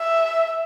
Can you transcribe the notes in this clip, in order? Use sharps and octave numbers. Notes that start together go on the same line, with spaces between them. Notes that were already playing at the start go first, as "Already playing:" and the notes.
Already playing: E5